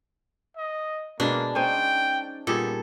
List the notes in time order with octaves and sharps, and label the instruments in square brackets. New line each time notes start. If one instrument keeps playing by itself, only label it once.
[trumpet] D#5
[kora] B2 G#3 [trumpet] A#3 [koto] D4
[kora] C#4 D#4 C5 [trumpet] G5
[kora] A#2 G3 G#4 [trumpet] B3 [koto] A4